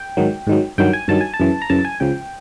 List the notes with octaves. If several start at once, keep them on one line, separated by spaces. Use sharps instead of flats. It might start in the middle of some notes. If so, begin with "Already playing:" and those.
Already playing: G5
G#2 D#3 F#3
G#2 D#3 F#3
G2 D#3 F#3 G5
G#5
G2 D#3 F#3 A5
G#5
A5
F#2 C#3 E3
A#5
F#2 C#3 E3 A5
G#5
C#2 C#3 F3 G5